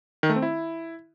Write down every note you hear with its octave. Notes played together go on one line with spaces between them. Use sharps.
D#3
A3
C4
E4